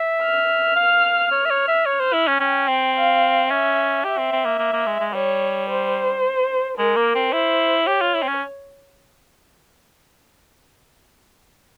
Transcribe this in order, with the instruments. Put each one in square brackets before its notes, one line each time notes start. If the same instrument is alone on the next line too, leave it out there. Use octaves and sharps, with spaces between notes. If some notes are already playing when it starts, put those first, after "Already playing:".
Already playing: [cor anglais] E5
[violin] F6
[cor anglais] F5
C#5
E5
C#5
E5
C#5
C5
E4
C#4
[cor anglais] C#4 [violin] G5
[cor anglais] C4
[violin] F5
[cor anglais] C#4 [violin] E5
[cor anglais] G4 [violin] E5
[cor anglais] C4
C4
A#3
A#3
A#3
G#3
G#3
[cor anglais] G3 [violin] C#5
[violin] C5
[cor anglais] G#3 [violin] A#4
[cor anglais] A#3
C4
[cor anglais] E4 [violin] C5
[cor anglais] G4 [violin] C#5
[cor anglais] F4
E4
C4
C#4